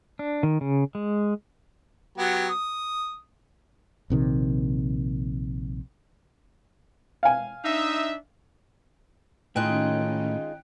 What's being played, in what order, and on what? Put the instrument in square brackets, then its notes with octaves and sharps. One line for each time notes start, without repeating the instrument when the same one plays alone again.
[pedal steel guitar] D4
D#3
C#3
G#3
[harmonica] F#3 B3 G4
D#6
[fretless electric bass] A#1 C3 D#3
[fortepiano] F5 G#5
[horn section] D4 D#4 E5
[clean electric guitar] A2 [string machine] D#3 C#4 [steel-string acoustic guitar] G#3 D#4 F4 [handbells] G5 F#6